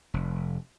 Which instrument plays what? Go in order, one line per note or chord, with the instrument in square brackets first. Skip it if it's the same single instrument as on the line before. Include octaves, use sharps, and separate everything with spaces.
[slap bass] F1